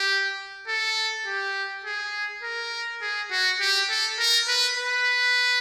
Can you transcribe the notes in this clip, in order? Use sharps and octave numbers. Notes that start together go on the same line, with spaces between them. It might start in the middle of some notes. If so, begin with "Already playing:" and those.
Already playing: G4
A4
G4
G#4
A#4
G#4
F#4
G4
A4
A#4
B4
B4